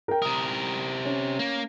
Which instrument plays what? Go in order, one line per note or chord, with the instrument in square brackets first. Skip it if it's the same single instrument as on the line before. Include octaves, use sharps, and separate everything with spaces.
[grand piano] A#4 G5
[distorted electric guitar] C3 A#4 [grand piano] A#5 D#6
[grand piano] C#4
[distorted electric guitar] A#3